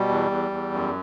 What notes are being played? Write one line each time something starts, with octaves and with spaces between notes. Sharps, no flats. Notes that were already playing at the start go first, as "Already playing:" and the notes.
Already playing: B2 G3
E2
E2
E2
F#2